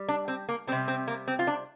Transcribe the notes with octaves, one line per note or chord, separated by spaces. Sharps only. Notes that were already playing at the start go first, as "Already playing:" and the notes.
Already playing: G3
D4
C4
A#3
C3 G3 C4
C4
A#3
C4
F4
D4